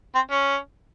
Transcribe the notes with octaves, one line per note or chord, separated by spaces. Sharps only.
C4
C#4